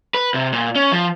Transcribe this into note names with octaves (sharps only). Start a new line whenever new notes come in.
B4
C3
A#2
C#4
F3